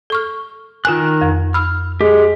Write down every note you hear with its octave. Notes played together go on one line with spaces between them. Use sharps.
A4 C#6 F6
D#3 F4 A#4 G#5 F#6
F2
B5 E6 F6
G#3 G4